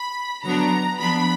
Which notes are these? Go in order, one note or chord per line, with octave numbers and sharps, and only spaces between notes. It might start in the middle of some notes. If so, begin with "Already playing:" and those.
Already playing: B5
D3 F#3 B3 D4 A#5
F3 B3 D4 B5